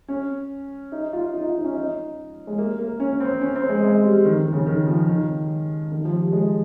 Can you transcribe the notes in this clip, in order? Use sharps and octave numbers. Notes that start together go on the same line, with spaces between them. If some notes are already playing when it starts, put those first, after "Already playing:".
C#4
D#4
F4
D#4
F4
D#4
C#4
D#4
G#3
A#3
A#3
C#4
C4
C#4
C4
G#3
G#3
G3
D#3
D#3
C#3
D#3
F3
D#3
D#3
F3
G3
G#3